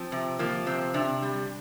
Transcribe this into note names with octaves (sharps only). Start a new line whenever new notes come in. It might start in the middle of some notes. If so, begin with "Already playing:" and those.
Already playing: F3 C4
C3
F3 A#3
C3 C4
C3 D4
G3